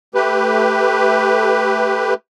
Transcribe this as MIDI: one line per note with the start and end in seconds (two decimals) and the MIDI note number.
0.15 2.14 57
0.15 2.14 67
0.15 2.14 71